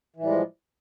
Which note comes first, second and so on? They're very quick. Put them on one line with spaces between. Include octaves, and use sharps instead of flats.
E3 A2 G3 G#3 F3